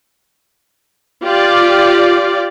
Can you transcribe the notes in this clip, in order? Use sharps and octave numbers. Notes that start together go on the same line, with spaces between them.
F4 G4 D5